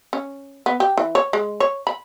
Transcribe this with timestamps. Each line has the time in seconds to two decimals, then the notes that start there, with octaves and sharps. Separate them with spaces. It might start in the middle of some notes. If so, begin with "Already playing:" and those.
0.13 C#4
0.66 B3
0.80 G4
0.97 E3
1.15 C#5
1.33 G#3
1.60 C#5
1.87 B5